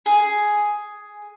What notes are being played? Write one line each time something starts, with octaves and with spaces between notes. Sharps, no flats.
G#4